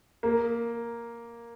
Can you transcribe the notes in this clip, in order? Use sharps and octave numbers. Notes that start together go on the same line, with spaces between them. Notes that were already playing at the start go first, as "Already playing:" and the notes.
A#3